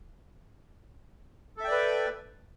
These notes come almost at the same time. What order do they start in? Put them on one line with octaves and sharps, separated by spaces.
A4 E5 G5 D5 B4